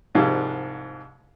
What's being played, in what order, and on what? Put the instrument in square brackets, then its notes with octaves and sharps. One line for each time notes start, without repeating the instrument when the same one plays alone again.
[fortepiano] C2 G#2 F3 G3 G#3